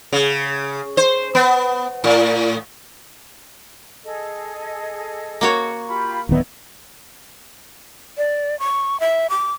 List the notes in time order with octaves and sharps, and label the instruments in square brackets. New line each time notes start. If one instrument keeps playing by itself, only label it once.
[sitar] C#3
C5
B3
A2
[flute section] G#4 A4 D#5
[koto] A#3 F#4 C#5
[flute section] F4 G4 B5
[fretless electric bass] D1 D#3 B3 [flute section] D#4 E4 D5
[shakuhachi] D5
C#6
E5
D6